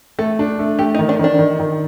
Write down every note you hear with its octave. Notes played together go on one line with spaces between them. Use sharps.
A3 A4
D4
A3
A3 G4
D#4
D#3
D4
D#3 D4
D#3
D#3